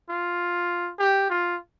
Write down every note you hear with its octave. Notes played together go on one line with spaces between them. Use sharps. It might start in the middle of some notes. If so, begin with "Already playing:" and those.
F4
G4
F4